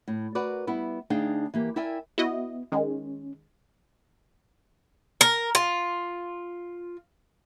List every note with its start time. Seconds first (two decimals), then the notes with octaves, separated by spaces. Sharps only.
0.08 A2
0.35 F#4 A#4 B4 D5
0.67 G3 B3 E4
1.10 D2 D4 D#4 G#4 F5 G5
1.54 E3 A#3 G4
1.76 E4 A#4 D5 E5 G5 G#5
2.18 B3 E4 F#4 D#5
2.72 D#3 G#3 C#4
5.21 A#4
5.55 F4